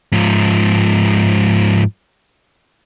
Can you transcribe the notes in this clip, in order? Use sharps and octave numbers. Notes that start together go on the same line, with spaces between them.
G#2 F3